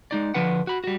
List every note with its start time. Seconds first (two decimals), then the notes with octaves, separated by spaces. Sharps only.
0.11 G#3 D#4 D5
0.34 D3 F3 D4 B4 F#5
0.67 F#4 B5
0.84 G3 F#4